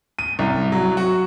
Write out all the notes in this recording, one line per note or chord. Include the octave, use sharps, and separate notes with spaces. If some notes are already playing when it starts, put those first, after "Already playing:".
D#7
C2
F#3
F#4